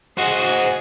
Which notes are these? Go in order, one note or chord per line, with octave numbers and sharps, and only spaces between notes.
F#4 G#4 C5 D#5